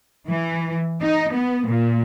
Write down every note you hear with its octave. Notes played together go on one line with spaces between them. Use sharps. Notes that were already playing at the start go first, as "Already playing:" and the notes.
E3
D#4
B3
A#2